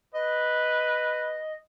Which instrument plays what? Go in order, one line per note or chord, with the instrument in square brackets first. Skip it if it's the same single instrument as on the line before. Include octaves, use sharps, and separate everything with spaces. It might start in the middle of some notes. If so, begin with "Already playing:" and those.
[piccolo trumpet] B4 [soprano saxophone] D#5